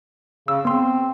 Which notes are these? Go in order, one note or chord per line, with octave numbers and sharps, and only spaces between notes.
C#3 E6
B3 C4 C6